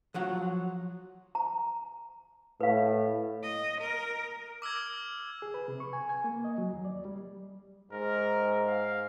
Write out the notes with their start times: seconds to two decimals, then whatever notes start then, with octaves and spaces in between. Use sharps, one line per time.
0.14 F3 F#3 F#5
1.35 A#5
2.60 A2 B4 F5
3.43 D#5
3.81 A#4
4.62 D6 E6 F6 G#6
5.42 G#4
5.54 B4
5.68 C3
5.80 C#6
5.93 G#5
6.09 G#5
6.24 A#3
6.44 D#5
6.58 F#3
6.73 D#2
6.85 D5
7.05 G3
7.92 G#2 A#4
8.67 F5